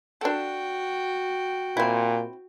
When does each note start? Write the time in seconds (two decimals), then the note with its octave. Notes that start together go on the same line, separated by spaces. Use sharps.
0.21 D4 F#4 A4 G5
1.77 A#2 C4 E4